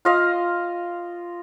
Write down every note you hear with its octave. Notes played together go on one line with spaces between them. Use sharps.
F4 D#5 F5